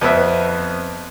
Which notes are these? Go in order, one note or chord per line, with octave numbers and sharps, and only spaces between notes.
F2 B3 C4 E5